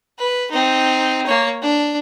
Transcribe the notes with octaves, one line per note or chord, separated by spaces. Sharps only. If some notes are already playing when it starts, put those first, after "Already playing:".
B4
C4 D#4
A#3 C#5
D4